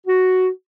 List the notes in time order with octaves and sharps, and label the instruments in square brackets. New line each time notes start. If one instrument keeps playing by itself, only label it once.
[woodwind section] F#4